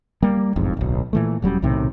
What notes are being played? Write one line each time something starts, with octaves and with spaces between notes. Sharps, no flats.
G3 A#3
E1 A1 F2 G#2
D1 B1
A#2 E3 A3
E1 F#3 G3 C#4
B1 A2 C3 D#3